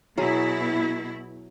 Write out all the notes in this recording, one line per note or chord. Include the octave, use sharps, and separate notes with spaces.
B2 F#3 E4 G#4